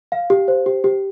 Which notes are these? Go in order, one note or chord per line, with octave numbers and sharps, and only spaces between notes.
F5
G4
C5
G4
G4